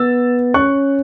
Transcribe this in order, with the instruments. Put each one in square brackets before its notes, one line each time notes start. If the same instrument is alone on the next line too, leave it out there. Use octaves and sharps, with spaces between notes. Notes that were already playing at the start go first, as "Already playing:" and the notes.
Already playing: [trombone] B3 [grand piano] E6 A6
[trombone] C#4 [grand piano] C#6 F#6